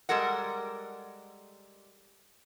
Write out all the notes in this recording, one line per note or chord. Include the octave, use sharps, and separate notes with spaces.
G3 G#3 A4 A#4 F#5